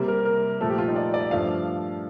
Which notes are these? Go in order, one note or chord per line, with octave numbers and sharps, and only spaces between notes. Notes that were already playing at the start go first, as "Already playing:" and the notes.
Already playing: C3 G3 A#3
A#4
A#4
A#2 F3 A3 A4
G4
F4
D#4
D5
D5
G2 F3 A3 F5